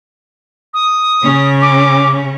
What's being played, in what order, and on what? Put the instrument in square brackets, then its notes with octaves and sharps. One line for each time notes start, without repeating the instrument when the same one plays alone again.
[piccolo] D#6
[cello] C#3 C#4
[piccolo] D6